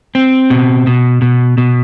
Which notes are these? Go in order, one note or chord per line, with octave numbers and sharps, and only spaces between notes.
C4
B2
B2
B2
B2